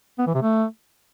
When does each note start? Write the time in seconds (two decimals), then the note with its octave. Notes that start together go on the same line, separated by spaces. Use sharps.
0.19 B3
0.27 E3
0.35 C3
0.43 A3